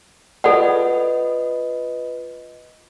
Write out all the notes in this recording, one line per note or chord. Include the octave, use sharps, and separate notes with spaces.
F4 A4 B4 D5 D#5 F#5